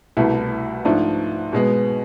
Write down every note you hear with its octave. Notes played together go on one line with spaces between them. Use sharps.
C2 B2 A3 E4
G#2 F3 A3 D4
B2 G#3 B3